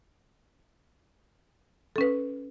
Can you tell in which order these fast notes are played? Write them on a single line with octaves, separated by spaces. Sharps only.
A4 C#4 B4